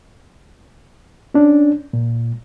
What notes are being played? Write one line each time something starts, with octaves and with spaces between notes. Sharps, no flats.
C#4 D4
A#2